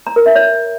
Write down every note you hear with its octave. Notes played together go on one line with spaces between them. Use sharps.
A#5
A#4
E5
C#5